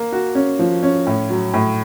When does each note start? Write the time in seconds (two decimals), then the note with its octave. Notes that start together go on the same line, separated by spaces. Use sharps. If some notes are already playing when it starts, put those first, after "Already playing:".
Already playing: A#3
0.12 F#4
0.35 C#4
0.59 F3
0.83 C#4
1.07 A2
1.30 F#3
1.54 A2